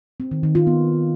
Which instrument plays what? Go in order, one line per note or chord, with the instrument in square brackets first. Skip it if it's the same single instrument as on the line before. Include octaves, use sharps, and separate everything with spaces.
[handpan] C4
D#3
D#3
F4
B3